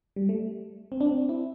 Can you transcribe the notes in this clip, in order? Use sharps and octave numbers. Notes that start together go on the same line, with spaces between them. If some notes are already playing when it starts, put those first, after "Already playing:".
G3
A3
C4
D4
C4
E4